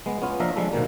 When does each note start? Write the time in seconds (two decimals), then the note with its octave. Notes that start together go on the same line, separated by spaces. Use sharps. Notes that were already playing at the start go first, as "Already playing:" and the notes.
0.06 G#3 B3
0.22 B3 C#4 F4
0.40 F3 A#3 D4 A#4 D#5 E5
0.56 F3 G3 G#3 D4 A4
0.73 G#2 B2 D#3 A#3